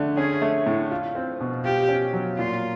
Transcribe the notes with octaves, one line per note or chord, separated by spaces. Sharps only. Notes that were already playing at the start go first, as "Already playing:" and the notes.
Already playing: D3 A3
C#4 G#4
A3
A2
F4
C4
B2
F4 G4
C#4
F#3
A#2 F4